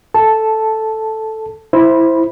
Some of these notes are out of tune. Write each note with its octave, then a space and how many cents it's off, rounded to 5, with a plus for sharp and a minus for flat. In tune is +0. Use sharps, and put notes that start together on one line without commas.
A4 +0 A5 -5
E4 +0 C5 +0 B5 -15